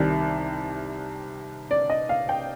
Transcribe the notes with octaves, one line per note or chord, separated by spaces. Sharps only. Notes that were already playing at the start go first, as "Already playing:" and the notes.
Already playing: C2 C3 D#3 D5
D5
D#5
F5
G5